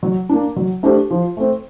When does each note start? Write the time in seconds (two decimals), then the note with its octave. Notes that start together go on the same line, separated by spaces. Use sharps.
0.03 F#3
0.29 A#3 D4
0.56 F#3
0.83 A3 D4 G4 C5
1.10 F3
1.37 A3 C4